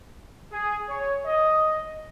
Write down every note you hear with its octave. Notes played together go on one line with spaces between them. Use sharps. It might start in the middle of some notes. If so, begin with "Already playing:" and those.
G#4
C#5
D#5